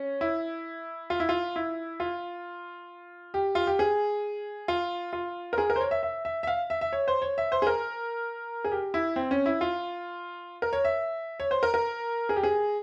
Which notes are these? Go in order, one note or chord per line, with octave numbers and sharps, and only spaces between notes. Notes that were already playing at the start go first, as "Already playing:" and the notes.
Already playing: C#4
E4
F4
E4
F4
E4
F4
G4
F4
G4
G#4
F4
F4
A#4
G#4
A#4
C5
C#5
E5
E5
E5
E5
F5
E5
E5
C#5
C5
C#5
E5
C5
G#4
A#4
G#4
G4
E4
C4
C#4
E4
F4
A#4
C#5
E5
C#5
C5
A#4
A#4
G#4
G4
G#4